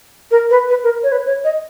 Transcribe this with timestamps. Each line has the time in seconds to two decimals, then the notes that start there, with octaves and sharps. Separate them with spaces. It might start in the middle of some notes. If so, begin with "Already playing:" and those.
0.31 A#4
0.50 B4
0.69 B4
0.83 A#4
1.03 C#5
1.12 B4
1.26 C#5
1.44 D#5